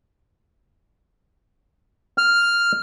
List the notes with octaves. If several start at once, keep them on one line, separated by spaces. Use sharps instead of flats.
F6